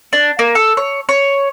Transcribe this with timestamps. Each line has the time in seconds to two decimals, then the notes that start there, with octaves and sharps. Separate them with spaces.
0.13 D4
0.39 A#3
0.55 A4
0.77 C#5
1.09 C#5